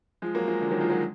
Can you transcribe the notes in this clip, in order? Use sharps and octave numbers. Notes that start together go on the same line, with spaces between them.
F3 G#3
F#3 A#3
F3 G#3
D3 F3
D#3 F#3
F3 G#3
F#3 A#3